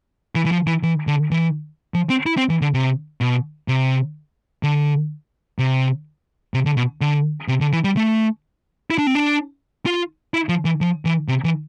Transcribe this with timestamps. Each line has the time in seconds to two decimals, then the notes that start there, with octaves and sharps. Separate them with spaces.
0.35 E3
0.46 E3
0.52 F3
0.67 E3
0.83 E3
1.07 D3
1.31 E3
1.94 F3
2.10 C4
2.26 E4
2.37 C4
2.49 E3
2.62 D3
2.74 C3
3.21 B2
3.68 C3
4.63 D3
5.59 C3
6.54 C3
6.65 D3
6.77 B2
7.01 D3
7.48 C3
7.61 D3
7.73 E3
7.84 G3
7.97 A3
8.91 E4
8.98 D4
9.07 C4
9.15 D4
9.86 F4
10.34 E4
10.49 F3
10.65 E3
10.81 F3
11.05 E3
11.28 C3
11.44 E3